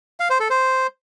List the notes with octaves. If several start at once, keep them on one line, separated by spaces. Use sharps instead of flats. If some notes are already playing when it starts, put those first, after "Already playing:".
F5
C5
A4
C5